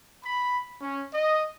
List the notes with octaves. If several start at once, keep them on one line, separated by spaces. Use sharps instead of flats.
B5
C#4
D#5